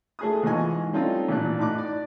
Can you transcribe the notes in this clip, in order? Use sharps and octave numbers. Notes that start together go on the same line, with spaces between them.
A3 G#4 D#6
E2 G#2 F4 D#5 G#5 C#6
G3 A3 C4 C#4 D#4 F4
A1 A#2 D4 F#6
A2 D#4 D6 F#6
D5